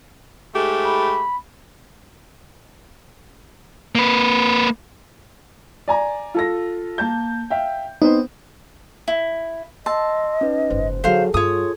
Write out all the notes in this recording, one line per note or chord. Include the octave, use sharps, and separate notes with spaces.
G#2 A3 G4
B5
A#3 B4
D5 G#5 A#5
F4 A4 A#6
A#3 A5 G6
E5 F5 G5
B3 C4 D#4 C5
E4
D#5 A5 C6 E6
C#4 D#4 B4
F#1 G#2 C5
D3 F#3 D#4 G#4 A4 C5 F5
G2 F4 C#5 D#6